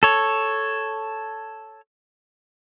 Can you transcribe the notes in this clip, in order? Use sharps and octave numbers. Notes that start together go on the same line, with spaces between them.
A4 C#5